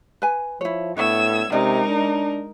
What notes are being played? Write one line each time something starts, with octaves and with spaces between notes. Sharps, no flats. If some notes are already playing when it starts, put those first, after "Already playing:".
B4 G#5
F3 E4 C#5
A2 B3 D4 C#5 E5 E6 G#6
C3 G#3 C#4 D#4 A#4 D5 D#5
D4